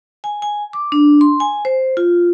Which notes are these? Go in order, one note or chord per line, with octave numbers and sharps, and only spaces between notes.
G#5
G#5
D6
D4
C6
G#5
C5
F4